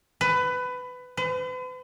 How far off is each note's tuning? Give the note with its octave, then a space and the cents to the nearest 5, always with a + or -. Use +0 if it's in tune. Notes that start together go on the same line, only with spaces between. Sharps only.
B4 +20
B4 +45